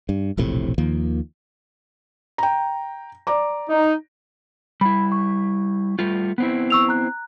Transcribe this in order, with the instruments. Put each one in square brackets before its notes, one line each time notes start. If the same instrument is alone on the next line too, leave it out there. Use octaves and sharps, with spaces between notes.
[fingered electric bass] G2
E1 A#1 A2 C3
D#2 D#3 F3 A#3
[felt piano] G5 A#5
D5 A#5 D6
[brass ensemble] D#4
[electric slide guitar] G3 E4 [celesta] B5
[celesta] C#6
[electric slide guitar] G3 A3 F4
B3 C4 E4
[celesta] C#6 E6 F7
A#5 F#6